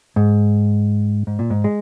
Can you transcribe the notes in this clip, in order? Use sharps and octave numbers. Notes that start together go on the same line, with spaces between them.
G#2
G#2
A#2
G#2
G#3